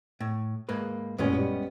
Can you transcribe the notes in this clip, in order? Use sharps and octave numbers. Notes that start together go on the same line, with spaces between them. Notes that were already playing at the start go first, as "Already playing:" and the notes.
A2
G#2 A#3 B4
A1 F#2 A#2 G#3 B3 C#4
G3